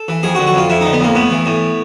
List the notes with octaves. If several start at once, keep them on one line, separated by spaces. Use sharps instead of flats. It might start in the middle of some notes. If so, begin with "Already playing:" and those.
Already playing: A4
E3
F2 G#4
F#4
D3
F#4
F2 F4
F2 E4
D3 D#4
B3
F2 A#3
A2 B3
E3
A2